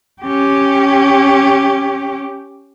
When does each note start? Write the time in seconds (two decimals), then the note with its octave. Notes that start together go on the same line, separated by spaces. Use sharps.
0.23 C#4 G4